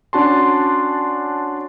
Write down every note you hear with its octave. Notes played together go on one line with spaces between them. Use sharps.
C#4 D4 F#4 A5 C6